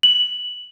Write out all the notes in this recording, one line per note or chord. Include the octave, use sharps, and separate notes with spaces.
F#7